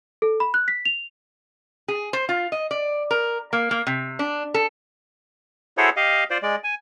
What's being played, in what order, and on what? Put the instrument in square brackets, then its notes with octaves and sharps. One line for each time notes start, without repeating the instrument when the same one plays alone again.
[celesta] A4
B5
F#6
B6
F7
[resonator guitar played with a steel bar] G#4
C5
F4
D#5
D5
A#4
A#3
A#3
C3
D4
A4
[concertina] E4 F#4 G#4 A4 C5 C#5
G4 D#5 F5
F4 C5 D5
G#3 D5
G#5